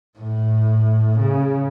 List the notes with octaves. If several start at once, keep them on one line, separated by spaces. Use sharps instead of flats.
A2
C#3